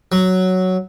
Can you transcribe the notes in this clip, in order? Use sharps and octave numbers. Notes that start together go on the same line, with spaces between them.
F#3